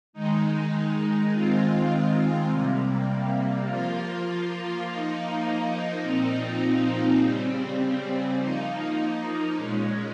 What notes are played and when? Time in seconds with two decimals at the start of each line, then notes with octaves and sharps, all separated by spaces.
0.13 D#3 G#3 D#4
1.30 D#3 G#3 C4 F4
2.48 C3 G3 A#3
3.66 F3 A#3 F4
4.84 F3 A#3 D#4
6.01 A#2 F3 C4 D#4
7.18 C#3 G3 C4
8.36 F3 A#3 D#4
9.53 A#2 G#3 C#4